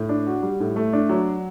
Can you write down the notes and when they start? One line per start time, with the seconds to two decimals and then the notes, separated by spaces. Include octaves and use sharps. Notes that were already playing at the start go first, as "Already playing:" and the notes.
Already playing: A2
0.09 D4
0.27 F#4
0.43 G3
0.60 A2
0.76 A3
0.93 D4
1.09 F#3